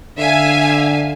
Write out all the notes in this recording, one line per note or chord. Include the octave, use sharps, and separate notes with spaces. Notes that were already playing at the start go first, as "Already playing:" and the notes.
D3 E5 F5 G#5